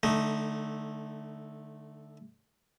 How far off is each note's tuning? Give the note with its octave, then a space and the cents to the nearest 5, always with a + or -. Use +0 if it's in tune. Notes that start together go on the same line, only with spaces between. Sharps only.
D3 +15 A3 -10 D#4 -5